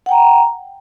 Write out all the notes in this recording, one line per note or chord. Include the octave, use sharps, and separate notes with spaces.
F#5 G5 A#5